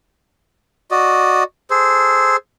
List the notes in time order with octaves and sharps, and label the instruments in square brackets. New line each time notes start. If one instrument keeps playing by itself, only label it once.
[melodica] F#4 D5 D#5
G#4 A4 C5